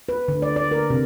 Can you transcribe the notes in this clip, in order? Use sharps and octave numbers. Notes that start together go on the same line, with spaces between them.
B4
D3
D5
D5
A#4
C3